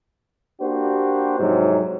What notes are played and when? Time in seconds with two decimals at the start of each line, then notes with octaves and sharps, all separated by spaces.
0.61 A#3 D4 F#4 G4 C5
1.40 F2 G#2 C3 F#3